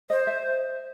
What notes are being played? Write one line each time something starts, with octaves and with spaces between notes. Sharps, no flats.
C5 D#5
E5